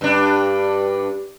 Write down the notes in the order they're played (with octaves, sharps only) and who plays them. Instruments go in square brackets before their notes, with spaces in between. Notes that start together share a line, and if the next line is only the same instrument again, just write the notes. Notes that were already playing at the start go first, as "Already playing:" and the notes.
[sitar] G2 D4